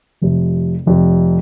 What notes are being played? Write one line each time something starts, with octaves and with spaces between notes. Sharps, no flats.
F1 F2 C3
F1 F2 C3